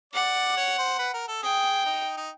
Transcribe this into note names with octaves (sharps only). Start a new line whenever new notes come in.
D5 F#5
C#5
C5
B4
A#4
A4
G#4 G5
D#4
D#4